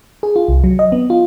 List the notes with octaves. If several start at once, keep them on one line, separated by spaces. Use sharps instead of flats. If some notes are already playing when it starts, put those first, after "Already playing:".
G#4
F4
C2
F#3
D#5
B3
F4